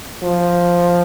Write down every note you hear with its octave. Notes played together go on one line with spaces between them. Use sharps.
F3